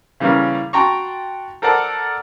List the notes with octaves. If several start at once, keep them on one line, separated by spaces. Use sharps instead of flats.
C#3 E3 G3 A#3 C#4 A#4
F#4 G5 A5 A#5 C6 C#6
A4 A#4 C5 D5 F#5 A5